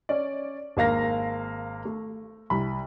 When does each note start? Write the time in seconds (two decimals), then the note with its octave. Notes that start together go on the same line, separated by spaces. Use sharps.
0.09 C#4 D5
0.77 G#1 A#3 F5 A#6
1.85 A3
2.50 C2 B5